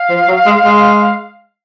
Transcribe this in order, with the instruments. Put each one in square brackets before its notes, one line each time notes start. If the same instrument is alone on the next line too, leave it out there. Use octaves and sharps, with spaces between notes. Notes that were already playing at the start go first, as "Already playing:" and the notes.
Already playing: [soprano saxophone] F5
[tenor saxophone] F3
F#3
G#3
G#3